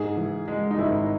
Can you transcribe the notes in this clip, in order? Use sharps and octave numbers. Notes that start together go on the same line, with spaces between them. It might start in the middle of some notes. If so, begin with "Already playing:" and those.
Already playing: G#2 G#4
E3
G#3
D#4
G#1 E4